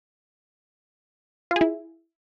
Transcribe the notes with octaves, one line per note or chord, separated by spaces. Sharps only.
F4
G#4
E4